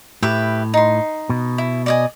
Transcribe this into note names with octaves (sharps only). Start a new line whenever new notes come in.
A2 G4 B4 E5
D#4 C6
B2
E4
D5 D#5 G#5